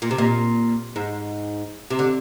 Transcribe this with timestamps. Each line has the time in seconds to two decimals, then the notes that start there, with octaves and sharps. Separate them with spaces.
0.02 A#2
0.11 C3
0.18 A#2
0.96 G#2
1.90 C3
1.99 D3